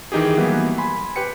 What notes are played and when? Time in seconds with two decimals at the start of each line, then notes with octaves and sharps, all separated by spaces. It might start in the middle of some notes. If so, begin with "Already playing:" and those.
0.12 D#3 E3 D#4 G4 G#4
0.37 E3 F#3 G3 A#3 B3
0.78 G#5 B5 C6
1.16 G4 B4 G5 C#7